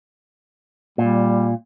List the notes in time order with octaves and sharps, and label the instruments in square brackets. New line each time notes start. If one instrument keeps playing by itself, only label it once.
[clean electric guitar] A#2 [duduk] G3